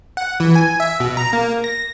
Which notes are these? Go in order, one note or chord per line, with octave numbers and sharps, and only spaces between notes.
F#5
E3
G#5
E5
B2
A#5
A#3
A#6